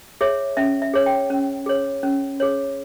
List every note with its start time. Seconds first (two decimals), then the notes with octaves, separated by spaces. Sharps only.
0.21 G#4 C#5 E5
0.57 C#4 E5
0.82 E5
0.94 G#4 C#5
1.06 G5
1.30 C#4
1.66 G#4 C#5
2.03 C#4
2.40 G#4 C#5